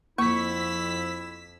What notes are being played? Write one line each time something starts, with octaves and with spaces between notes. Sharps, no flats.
F2 A#3 E4 C#6 E6 B6